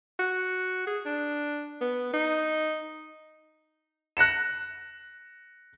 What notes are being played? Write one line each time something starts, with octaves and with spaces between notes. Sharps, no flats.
F#4
G#4
D4
B3
D#4
F#6 A#6 C#7 E7